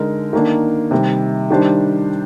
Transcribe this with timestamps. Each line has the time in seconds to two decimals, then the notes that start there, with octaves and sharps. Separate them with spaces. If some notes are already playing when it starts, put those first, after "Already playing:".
Already playing: D3 G#3 D#4 A#4
0.33 D#3 A#3 D4
0.91 C3 D#3 G3
1.50 D#3 G3 D4 G4 C5